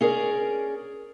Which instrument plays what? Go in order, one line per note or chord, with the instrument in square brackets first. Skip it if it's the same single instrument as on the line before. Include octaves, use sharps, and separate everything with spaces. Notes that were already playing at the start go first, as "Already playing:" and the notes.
[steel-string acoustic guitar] C#4 G#4 A#4 D5